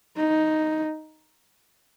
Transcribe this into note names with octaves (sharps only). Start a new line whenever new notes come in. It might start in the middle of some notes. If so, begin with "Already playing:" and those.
D#4